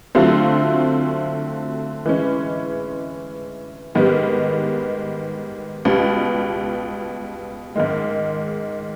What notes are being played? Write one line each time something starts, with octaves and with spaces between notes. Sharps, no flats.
D3 F#3 A3 C4 F4
E3 G#3 C#4
G#2 D#3 G3 B3
C#2 B2 G3
G#2 D#3 G#3